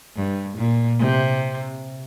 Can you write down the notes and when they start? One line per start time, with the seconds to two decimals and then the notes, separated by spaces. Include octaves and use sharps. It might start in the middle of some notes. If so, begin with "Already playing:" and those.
0.16 G2
0.57 A#2
0.99 C3